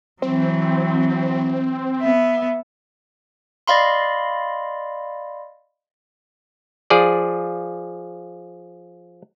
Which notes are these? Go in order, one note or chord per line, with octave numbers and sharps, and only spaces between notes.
E3 F#3 C4
B3 E5
D5 D#5 F5 B5 C6
F3 G#4 D5